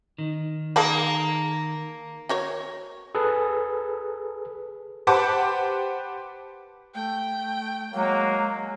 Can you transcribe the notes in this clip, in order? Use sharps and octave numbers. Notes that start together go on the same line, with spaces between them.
D#3
A#3 G#4 A5 B5
F#4 A#4 C#5
G#4 A4 B4
G4 B4 C5 F#5 A5 D6
A3 G5
F#3 G#3 A#3